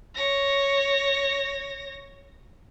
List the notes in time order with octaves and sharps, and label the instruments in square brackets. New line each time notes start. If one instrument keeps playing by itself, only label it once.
[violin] C#5 A#6